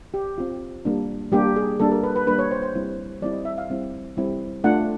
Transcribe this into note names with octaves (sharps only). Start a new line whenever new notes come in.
G4
C4 F4
G3 A#3 D4
G3 A#3 D4 G4
G#4
G3 A#3 D4 A4
A#4
B4
B4
G3 A#3 D4 B4
C#5
C5
C5
G3 C4 E4
G3 C4 E4 D5
D#5
E5
F5
G3 C4 E4
G3 C4 E4
A3 D4 F4 F#5